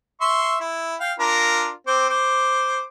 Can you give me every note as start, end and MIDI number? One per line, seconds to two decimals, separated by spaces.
0.21 0.57 76
0.21 0.57 84
0.21 0.57 85
0.61 0.95 64
1.00 1.13 77
1.00 1.13 79
1.19 1.70 62
1.19 1.70 65
1.19 1.70 70
1.87 2.09 60
1.87 2.09 72
1.87 2.09 86
2.10 2.84 72
2.10 2.84 86